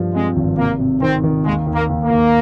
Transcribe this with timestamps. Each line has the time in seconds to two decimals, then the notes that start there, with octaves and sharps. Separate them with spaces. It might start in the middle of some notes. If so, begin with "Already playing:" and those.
Already playing: G2 F3 G3
0.15 G#3 C4
0.36 G#1
0.57 C3 A#3
0.80 C3
1.01 D#3 C4
1.23 D#3
1.45 D#2 G#3
1.66 D#2
1.75 A#3
1.89 D#2
2.03 A#3
2.10 D#2